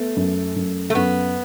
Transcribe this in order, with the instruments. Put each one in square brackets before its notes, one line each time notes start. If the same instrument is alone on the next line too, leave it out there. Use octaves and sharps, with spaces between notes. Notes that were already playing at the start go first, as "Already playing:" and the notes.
Already playing: [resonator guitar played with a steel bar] A3 [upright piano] B3
[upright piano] F#2
F#2
[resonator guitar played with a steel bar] A3
[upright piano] F#2 [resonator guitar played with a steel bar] B3